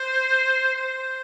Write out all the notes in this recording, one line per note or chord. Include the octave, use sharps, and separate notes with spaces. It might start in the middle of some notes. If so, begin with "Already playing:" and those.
Already playing: C5
C5